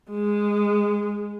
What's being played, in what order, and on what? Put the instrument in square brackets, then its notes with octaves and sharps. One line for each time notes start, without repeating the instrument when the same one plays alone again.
[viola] G#3